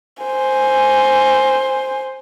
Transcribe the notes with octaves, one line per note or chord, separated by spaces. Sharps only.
C5 G#5